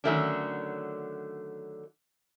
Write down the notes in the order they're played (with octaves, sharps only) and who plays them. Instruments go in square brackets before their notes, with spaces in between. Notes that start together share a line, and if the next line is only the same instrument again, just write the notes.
[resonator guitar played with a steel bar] D3 D#3 F#3 A3 C#4 D4